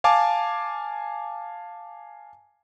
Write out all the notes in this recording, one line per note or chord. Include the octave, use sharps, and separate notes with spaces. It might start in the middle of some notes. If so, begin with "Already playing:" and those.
F5 G#5 A5 D6